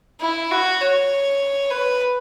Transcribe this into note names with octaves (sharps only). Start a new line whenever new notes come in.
E4
F#4
C#5
B4